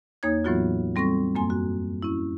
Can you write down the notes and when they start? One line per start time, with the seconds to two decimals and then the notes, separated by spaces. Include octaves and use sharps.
0.23 E2 A#3 D#4 C#5 D#6 G#6
0.44 A2 E3 F#3 B3 F4 F#4
0.96 G3 C4 A4 C#6 A#6
1.35 F#2 A#3 G#5 C6
1.50 F#4
2.03 C#4 E4